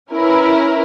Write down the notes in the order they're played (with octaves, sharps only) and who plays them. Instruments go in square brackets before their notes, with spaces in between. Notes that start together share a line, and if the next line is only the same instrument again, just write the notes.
[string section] C#4 E4 A#4 B4